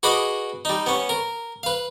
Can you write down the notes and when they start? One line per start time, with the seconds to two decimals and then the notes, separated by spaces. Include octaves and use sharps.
0.03 F#4 G#4 B4 D#5 B5 D6
0.65 G3 D#4
0.86 B3 C#4
1.09 A#4
1.63 B4 F5